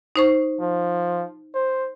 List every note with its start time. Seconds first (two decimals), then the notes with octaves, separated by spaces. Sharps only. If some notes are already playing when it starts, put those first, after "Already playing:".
0.16 D#4 C5 C#6
0.60 F3
1.55 C5